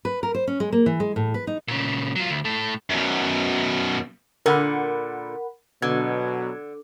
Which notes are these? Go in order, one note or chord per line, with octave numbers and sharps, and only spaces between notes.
B4
A#4
C5
C#4
G#3
A#3
E3
G#3
A2
B4
D#4
A#2 C#3
F#3 F4
D2
A2 A4
F#2 B2
A#2 D3 A#4 F#5 B5
B2 D3 F#3 G#6